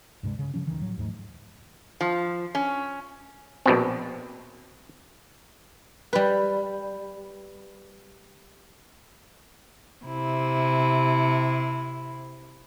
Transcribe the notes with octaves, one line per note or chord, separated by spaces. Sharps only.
C#2 G2 C3 G#3
C#3
C#3 F3 C#4
D1 C#2 D#3 E3
A2 F3 F#3
D#2 G#2 A3
F3
C#4
A#1 B2 C4
G3 B4
C3 E4